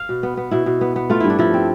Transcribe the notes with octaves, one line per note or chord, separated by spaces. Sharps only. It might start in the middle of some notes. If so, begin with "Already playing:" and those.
Already playing: F5
B2
B3
B3
B2 E4
B2
B3
B3
A3 F4
G2 E4
D4
F3 E4
C4